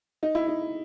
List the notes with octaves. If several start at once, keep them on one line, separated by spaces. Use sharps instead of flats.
D#4
E4
D#4